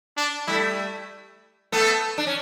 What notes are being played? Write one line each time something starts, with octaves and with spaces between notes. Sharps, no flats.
D4
G3 A3 E4
A3 B3 A4
D4
C#4